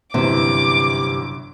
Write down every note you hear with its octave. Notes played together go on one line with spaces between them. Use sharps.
G1 F#2 C3 E3 D6